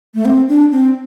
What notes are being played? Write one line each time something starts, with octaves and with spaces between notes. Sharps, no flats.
A3
C4
D4
C4